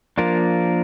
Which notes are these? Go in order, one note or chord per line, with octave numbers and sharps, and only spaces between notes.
F3 A#3 D4 F4 A#4